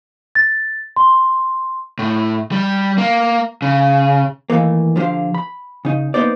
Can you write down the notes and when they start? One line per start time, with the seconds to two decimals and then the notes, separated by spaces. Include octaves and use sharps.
0.35 A6
0.96 C6
1.99 A2
2.52 G3
2.98 A#3
3.62 C#3
4.50 D#3 E3 A3 A#3
4.96 D3 F3 G4 C5 F5
5.34 B5
5.85 C#3 D#4
6.14 A#3 B3 D#4 C5 D5